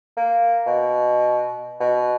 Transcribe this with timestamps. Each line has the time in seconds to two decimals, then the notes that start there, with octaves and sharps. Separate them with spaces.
0.17 A#3
0.67 B2
1.80 B2